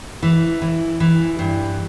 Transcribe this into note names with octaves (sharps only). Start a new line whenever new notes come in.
E3
E3
E3
G2